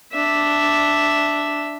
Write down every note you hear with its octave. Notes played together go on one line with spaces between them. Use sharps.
D4 E5